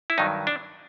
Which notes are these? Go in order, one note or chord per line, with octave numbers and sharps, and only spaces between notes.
E4
G2 D#3 F#3 D#4
D4